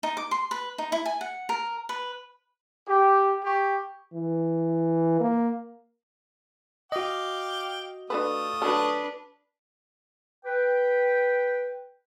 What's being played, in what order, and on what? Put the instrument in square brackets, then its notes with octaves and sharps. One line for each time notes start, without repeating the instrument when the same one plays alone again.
[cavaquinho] D#4
D6
C6
B4
D#4
E4
G#5
F#5
A#4
B4
[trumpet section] G4
G4 C#6
[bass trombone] E3
A#3
[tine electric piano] F#4 D#5 [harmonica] F5 G5 D6
[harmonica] A3 F4 D#6 [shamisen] D4 A4 B4
[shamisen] F#3 A4 [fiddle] D4 B4
[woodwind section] B4 G5